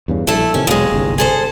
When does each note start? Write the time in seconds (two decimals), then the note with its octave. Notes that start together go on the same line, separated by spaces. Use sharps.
0.08 E2 G2 C#3
0.27 A#1 G3 A3 E4 A4
0.54 A1 C3 D#3 C#4
0.67 E1 D#2 B2 F#3 G#3
0.92 G1 C2 G2
1.18 G#4 A4 C5